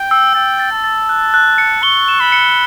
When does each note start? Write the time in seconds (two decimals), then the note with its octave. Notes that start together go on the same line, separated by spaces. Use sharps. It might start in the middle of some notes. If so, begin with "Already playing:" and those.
Already playing: G5
0.11 E6
0.35 G5 A6
0.60 A6
0.72 A5
0.84 A6
1.09 F#6
1.34 F#6
1.58 C#7
1.83 C#6 G7
2.08 E7
2.20 B5
2.32 C#7